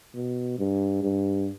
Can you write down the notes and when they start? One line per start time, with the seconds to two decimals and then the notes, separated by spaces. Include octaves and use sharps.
0.14 B2
0.59 G2
1.03 G2